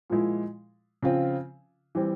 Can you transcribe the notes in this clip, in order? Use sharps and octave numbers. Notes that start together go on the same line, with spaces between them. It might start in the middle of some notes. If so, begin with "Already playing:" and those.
A#2 F3 G#3 E4
C#3 F3 C4 F4
E3 G3 C4